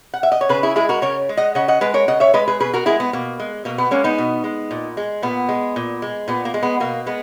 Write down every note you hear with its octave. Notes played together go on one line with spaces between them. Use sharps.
F#5
E5
D#5
C#5
C#3 G#4 B4
E4 G#4
G#3 E4 G#4
F#4 A#4
C#3 A#4 C#5
G#3
D#5 F#5
C#3 D#5 F#5
D#5 F#5
G#3 B4 D#5
A#4 C#5
C#3 D#5 F#5
C#5 E5
G#3 B4 D#5
G#4 B4
B2 G#4 B4
F#4 A#4
G#3 E4 G#4
B3
B2 A#3
G#3
B2 A#3
B3
G#3 A#3 C#4
B3 D#4
B2
G#3
A#2
G#3
A#2 B3
G#3
A#2
G#3
A#2 B3
A#3
G#3
B3
B2 A#3
G#3 B3